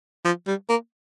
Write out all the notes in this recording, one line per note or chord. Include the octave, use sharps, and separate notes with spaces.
F3
G3
A#3